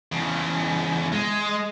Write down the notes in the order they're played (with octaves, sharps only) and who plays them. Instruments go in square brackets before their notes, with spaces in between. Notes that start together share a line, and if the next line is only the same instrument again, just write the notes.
[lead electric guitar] E2 C#3
G#3